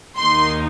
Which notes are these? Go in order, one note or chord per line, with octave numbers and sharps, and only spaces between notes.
D#2 D#3 A#3 D#4 C6